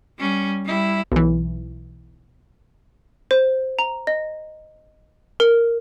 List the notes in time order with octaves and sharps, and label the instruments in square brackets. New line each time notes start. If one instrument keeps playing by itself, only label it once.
[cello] G3 C#4
G3 E4
[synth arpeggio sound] B1 E3
[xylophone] C5
A#5
D#5
A#4